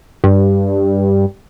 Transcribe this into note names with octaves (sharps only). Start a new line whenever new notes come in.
G2